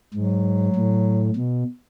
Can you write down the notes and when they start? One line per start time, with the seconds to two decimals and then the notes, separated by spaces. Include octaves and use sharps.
0.14 G#2 F#3
0.75 A2
1.36 B2